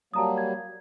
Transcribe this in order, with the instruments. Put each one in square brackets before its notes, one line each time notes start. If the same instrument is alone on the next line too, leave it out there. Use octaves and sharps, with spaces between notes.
[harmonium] F#3 G3 A#3 [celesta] A5 A#5 D#6
[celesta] G#6